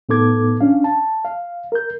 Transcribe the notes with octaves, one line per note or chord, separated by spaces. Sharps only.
A2 B3 D#4 A4 D6 G#6
C#4 D4 F5
A5
F5
A#4 G6